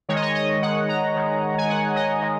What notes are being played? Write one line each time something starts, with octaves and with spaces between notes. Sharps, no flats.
D#3 G#3 C#5
D#5
C#5
D#5
D#3 G#3 F#5
A#5
D#3 G#3
G#5
D#3 G#3 F#5
D#5
D#3 G#3